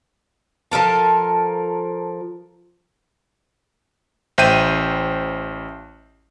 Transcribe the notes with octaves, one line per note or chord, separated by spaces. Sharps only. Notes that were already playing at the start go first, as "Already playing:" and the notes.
F3 A4 A#4 A5
A1 C5 E5 G5 G6 D#7